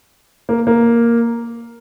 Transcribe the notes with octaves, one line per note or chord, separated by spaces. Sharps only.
A#3
A#3